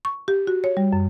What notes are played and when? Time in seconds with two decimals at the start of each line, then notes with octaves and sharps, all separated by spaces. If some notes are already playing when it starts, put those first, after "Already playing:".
0.05 C#6
0.28 G4
0.47 F#4
0.64 C#5
0.77 G3
0.93 F#2